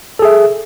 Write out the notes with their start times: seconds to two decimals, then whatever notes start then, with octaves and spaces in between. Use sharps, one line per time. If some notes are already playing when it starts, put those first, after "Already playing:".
0.19 A4
0.22 G#4
0.25 E5